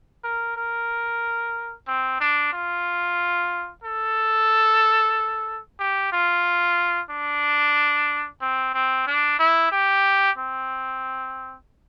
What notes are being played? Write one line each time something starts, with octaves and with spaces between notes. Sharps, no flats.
A#4
A#4
C4
D4
F4
A4
G4
F4
D4
C4
C4
D4
E4
G4
C4